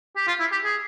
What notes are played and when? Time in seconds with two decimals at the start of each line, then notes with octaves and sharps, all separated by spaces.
0.16 G4
0.27 F4
0.40 E4
0.52 G4
0.65 G#4